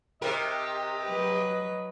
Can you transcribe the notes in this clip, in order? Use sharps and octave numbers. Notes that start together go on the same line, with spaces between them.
C3 G4 A#4 D#5
F#3 B4